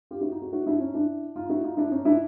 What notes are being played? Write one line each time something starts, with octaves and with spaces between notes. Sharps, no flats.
F4 G4
E4 F#4
D#4 F4
F#4 G#4
E4 F#4
D4 E4
C#4 D#4
D4 E4
D#4 F4
E4 F#4
D#4 F4
D4 E4
C#4 D#4
D4 E4